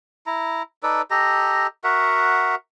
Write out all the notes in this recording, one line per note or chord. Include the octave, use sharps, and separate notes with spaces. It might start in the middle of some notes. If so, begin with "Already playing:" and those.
E4 A#5
D#4 A4 B4 D5
G4 A4 D#5 A#5
F#4 A#4 E5 F#5